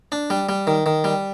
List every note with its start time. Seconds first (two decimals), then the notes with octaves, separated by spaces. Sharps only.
0.12 D4
0.30 G3
0.49 G3
0.67 D#3
0.86 D#3
1.04 G3